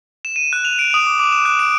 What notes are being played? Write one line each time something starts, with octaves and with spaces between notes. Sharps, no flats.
E7
D#7
F#6
F7
D7
D#6
D6
D6
E7
F#6
D7